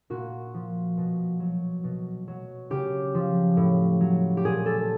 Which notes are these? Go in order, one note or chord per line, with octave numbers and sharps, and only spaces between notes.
A#2 F#4
F3
B2
F#3
B2
F#3
C#3 G4
F3
A2
F#3
G4
A#2 G#4
A4